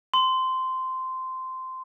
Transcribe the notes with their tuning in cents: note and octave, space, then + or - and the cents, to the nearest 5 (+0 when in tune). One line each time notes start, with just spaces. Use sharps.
C6 -10